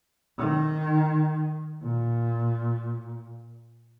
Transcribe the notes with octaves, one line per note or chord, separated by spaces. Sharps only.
D#3
A#2